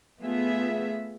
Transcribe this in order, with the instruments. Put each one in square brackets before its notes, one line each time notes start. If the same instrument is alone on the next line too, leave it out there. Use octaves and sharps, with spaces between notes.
[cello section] A3 B3 F4 G#4 E5